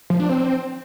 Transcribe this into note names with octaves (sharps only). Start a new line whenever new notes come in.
F3
D4
C4